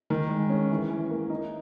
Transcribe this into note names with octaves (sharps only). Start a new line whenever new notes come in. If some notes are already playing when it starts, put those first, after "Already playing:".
D#3
G#3
C#4
E3
E3
A#3
D#4